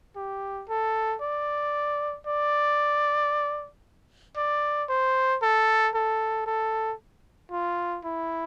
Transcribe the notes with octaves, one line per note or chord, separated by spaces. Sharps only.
G4
A4
D5
D5
D5
C5
A4
A4
A4
F4
E4